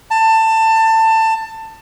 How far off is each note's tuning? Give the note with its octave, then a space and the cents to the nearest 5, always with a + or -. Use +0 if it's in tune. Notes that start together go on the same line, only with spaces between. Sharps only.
A5 +20